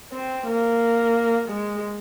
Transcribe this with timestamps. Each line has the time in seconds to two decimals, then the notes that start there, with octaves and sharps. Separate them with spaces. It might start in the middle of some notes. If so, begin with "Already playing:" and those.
0.13 C4
0.46 A#3
1.49 G#3